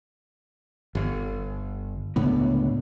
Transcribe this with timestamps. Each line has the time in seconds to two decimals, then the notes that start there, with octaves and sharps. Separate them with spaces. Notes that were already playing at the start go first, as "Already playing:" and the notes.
0.95 G1
2.16 C#2 A2 D3 B3